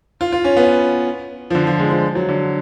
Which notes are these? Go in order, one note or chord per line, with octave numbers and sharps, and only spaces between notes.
F4
F4
C#4
B3
F3
D3
F3
G#3
F3
F#3
D3